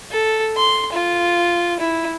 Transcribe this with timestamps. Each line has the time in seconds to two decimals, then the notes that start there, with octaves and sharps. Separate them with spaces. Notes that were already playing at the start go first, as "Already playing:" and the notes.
0.11 A4
0.57 C6
0.93 F4
1.80 E4